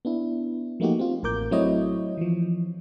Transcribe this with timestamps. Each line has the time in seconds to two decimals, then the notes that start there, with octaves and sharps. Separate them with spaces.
0.05 B3 D4 E4
0.80 F3 A3 A#3 D#4 F#4 G4
0.99 C4 F4
1.23 A1 A2 A#4 D6 G6
1.51 F#3 A3 C4 E4 C#5 D#5
2.17 E3 F3